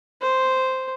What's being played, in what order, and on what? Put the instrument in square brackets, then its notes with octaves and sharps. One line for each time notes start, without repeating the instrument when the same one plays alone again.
[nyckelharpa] C5